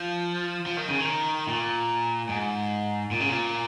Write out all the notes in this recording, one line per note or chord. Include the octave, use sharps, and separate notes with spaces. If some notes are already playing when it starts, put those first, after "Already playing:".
Already playing: F3
F3
D#3
C#3
D#3
A#2
G#2
A#2
C#3
A#2